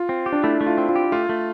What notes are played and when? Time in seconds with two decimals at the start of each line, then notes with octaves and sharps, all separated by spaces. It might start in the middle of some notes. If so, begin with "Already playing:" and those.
Already playing: F4
0.09 C4
0.26 G4
0.33 D4
0.43 A3 E4
0.61 A3
0.67 F4
0.78 C4
0.89 F4
0.96 G4
1.12 A3 F4
1.29 A3